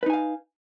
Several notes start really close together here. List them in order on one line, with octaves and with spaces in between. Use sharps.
B4 D#4 G#5 F5